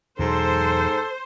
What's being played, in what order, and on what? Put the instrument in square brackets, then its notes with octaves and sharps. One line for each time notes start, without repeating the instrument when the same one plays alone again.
[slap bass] E2 B2 F#3 [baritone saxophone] G#2 [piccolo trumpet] A4 [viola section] C5